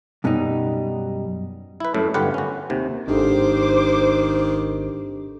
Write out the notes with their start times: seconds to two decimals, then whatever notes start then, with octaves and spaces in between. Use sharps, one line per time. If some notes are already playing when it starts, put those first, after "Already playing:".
0.24 F#2 B2 F#3 G3 D#4
1.80 E4 B4
1.94 F#2 A2 A3 E4
2.14 G1 D3 F4 G4 B4 F#5
2.34 C#4 F#4
2.70 D#2 C3
3.08 G#1 D#3 D4 G4 A4 C5 D6